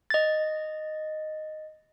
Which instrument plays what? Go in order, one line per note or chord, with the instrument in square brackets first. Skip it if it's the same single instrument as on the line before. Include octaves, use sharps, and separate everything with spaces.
[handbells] D#5 A6